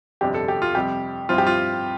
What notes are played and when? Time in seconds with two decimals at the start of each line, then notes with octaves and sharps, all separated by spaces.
0.21 G1 F2 C3 G3 D4 G4
0.34 A4
0.48 G4
0.62 F4
0.75 F2 C3 G3 G4
1.29 G2 F3 C4 E4 F4
1.38 G4
1.47 F4